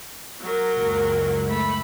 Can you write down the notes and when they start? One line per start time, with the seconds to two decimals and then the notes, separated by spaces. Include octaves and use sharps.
0.41 F#3 A#4
0.76 F#1 C#2
1.47 A3 B5